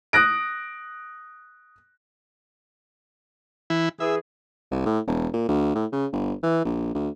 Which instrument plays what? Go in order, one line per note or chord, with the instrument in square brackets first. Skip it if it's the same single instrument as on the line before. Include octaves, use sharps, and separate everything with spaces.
[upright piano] D#6 F#6 A#6 D7
[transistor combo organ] E3 E4
[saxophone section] E3 G#4 [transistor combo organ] E5
[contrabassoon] C2
A2
E1
A#2
D2
A2
C#3
G1
E3
A#1
D2